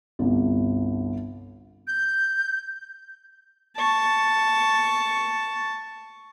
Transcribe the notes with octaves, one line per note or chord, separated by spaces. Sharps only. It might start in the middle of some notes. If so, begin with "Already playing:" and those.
G1 C2
G6
A5 C#6